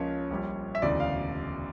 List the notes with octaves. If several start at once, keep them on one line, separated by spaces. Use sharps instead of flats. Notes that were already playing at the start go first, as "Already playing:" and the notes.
Already playing: C#2 C#3 F3 A#3 C#5
A#1 A#2 G3
E5
E1 D2 C#3 E3 D5
F5